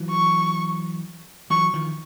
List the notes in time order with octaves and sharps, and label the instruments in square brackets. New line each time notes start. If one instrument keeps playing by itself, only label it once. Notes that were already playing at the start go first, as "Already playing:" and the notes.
Already playing: [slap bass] E3 F#3
[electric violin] C#6
[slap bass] E3 F#3 [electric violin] C#6
[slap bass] D#3 F3